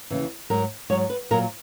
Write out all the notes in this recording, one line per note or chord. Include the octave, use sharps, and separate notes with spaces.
D#2 C#3 E3
G#2 F#3 A#4
G#2 F#3 C#5
B4
A#2 F#3 A#4